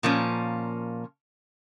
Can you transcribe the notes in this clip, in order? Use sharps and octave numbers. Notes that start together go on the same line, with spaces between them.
A#2 F3 A#3 C#4